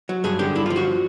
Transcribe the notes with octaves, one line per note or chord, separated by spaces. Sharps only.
F#3
G2 G#4
D3 G4
G2 E4
F4
F3
F#4